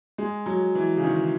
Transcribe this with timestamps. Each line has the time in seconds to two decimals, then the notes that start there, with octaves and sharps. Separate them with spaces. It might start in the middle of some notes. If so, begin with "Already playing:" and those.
0.18 G#3
0.46 F#3
0.75 E3
0.97 C#3
1.04 D#3